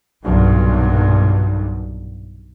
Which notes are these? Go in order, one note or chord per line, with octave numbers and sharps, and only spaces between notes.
B1 G2 A#2